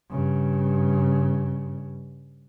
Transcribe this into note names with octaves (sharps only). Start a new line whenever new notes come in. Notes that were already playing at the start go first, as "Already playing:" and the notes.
G2 C#3